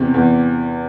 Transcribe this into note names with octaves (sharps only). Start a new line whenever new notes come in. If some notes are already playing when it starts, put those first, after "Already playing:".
Already playing: E2 C3
E2